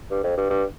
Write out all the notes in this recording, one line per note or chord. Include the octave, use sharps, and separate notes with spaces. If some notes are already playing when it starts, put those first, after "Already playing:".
G2
F2
G2
G2